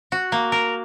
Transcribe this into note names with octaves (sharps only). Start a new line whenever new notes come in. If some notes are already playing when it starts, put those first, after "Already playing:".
F#4
A#3
A#4